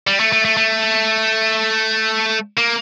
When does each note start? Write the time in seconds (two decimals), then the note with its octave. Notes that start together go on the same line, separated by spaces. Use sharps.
0.07 G3
0.20 A3
0.32 A3
0.45 A3
0.57 A3
2.58 A#3